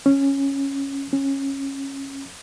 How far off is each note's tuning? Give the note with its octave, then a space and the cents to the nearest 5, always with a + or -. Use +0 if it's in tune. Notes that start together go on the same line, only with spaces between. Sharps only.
C#4 -10
C#4 -20